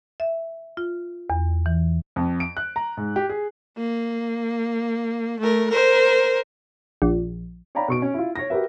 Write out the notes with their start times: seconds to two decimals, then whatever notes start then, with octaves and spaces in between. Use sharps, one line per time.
0.20 E5
0.77 F4
1.30 E2
1.66 E3
2.16 F2
2.40 D7
2.57 F#6
2.76 A#5
2.97 G#2
3.16 G4
3.29 G#4
3.77 A#3
5.39 A3 A#4
5.70 A#4 C5
7.02 A#1
7.75 C#5 D5 F5 G5 A#5 B5
7.88 B2 C#6 D7
8.02 C#4
8.14 E4 F4
8.36 C#5 A#6
8.50 F#4 G4 A#4 B4 E5